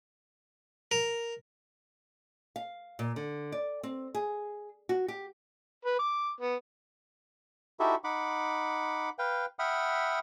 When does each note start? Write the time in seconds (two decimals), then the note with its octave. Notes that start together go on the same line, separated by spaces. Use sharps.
0.91 A#4
2.56 F5
2.99 A#2
3.16 D3
3.52 D5
3.83 C4
4.14 G#4
4.89 F#4
5.08 G4
5.85 B4
5.99 D6
6.41 B3
7.80 D#4 E4 F#4 G4 A4 E5
8.04 D#4 F#5 B5 D6
9.19 B4 F5 G5
9.59 E5 F#5 G5 B5 D#6 F6